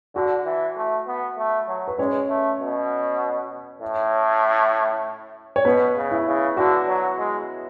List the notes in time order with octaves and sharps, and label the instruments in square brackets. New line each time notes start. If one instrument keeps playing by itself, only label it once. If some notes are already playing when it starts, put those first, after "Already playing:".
[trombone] D3 [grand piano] F#4
[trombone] E3
A3
B3
A3
F#3
[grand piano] B4
[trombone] G#3 [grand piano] C#4 C#5
[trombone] A3
B2
A2
[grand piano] C#5
[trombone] B2 [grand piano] B3 B4
[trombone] C#3
[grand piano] E4
[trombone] C#3
[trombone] D3 [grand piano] F#4
[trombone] F#3
G#3